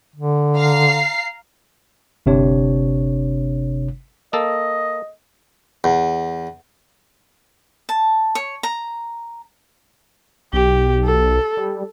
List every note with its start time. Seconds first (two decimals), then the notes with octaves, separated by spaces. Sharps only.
0.15 D3
0.55 F5 A#5 C7
2.26 G1 C3 D4 C#5
4.33 A#3 A4 D#5
5.84 E2
7.89 A5
8.35 C#5
8.63 A#5
10.53 B1 G4
11.04 A4
11.57 G3